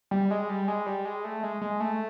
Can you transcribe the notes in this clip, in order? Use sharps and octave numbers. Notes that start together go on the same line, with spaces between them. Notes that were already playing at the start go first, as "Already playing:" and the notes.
G3
G#3
G3
G#3
G3
G#3
A3
G#3
G#3
A3